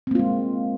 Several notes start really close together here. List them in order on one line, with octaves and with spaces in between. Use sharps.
C4 A#3 F4 G#3